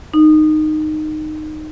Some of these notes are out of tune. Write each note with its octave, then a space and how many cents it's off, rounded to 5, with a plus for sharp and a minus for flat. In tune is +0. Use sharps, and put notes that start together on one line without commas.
D#4 -15